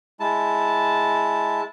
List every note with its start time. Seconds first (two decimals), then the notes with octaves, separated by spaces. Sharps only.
0.20 G#3 E4 A5